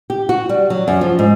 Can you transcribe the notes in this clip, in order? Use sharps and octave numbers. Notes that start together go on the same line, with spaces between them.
G4
F#4
G3
F#3
F#2
F3
G#2